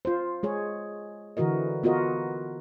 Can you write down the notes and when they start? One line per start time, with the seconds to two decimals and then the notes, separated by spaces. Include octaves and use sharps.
0.05 F4 C5
0.43 G#3 G#4 C#5
1.37 D3 E3 F#4 A#4 D#5
1.83 B3 F4 F#4 A#4 D#5